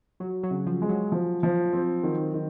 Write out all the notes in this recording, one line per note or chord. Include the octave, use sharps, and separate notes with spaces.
F#3 F#4
F#3
C#3
F3
G#3
F#3
F3
F3
C4
D#3 F#3
D#3